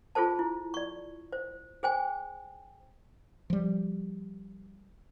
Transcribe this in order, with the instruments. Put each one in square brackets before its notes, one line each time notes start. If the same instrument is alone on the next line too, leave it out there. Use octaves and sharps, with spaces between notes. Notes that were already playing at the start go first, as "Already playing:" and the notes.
[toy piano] F4 G#4 A4 C5 A5
E4
D5 C#6
C5
G#4 C5 G5 G#5
[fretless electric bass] F3 G3